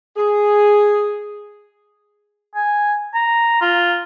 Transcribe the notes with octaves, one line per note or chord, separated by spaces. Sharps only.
G#4
G#5
A#5
F4